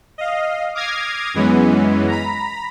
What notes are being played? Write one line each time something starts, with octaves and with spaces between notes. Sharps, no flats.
D#5 F5
D6 D#6 F6 G#6 A#6 C7
F#2 E3 G#3 B3 C#4
A#5 B5